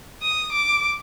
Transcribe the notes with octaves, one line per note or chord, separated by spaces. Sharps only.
D#6
D6